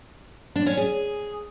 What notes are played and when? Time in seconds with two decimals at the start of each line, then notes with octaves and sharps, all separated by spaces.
0.56 D4
0.66 C#4
0.77 G#4